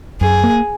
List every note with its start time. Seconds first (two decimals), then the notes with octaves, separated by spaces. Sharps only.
0.21 F#2 G#4
0.44 A#3